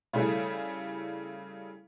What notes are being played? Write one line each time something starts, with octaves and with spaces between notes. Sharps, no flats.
C#3 G3 A3 E4 G#4